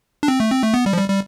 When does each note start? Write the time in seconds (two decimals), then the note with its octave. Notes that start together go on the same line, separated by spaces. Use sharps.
0.23 D4
0.28 C4
0.40 A3
0.51 C4
0.63 A3
0.74 B3
0.86 G3
0.93 F3
0.97 G3
1.09 G3